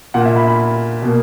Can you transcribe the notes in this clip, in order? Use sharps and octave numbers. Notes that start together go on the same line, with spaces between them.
A#2 A#3 F#5
E5
B5
B5
B2 A#3